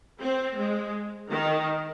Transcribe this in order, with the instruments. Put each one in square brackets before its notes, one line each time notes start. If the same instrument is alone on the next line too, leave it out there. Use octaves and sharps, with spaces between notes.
[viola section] C4
G#3
D#3